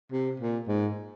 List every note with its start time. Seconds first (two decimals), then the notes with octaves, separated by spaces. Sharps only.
0.12 C3
0.40 A#2
0.68 G#2